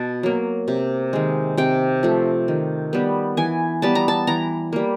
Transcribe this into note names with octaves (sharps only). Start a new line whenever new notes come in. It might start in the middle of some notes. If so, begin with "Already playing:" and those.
Already playing: B2 A5
F#3 A#3
C3
D#3 G#3
C3 G5
F3 A3
D#3
G3 B3
E3 G#5
G3 B3 A5
A#5
A5
E3 A#5
G3 A#3